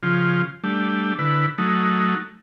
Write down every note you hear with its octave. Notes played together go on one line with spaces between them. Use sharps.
C#3 F3 F4
G3 A3 D4
D3 E4 B4
F#3 A3 D#4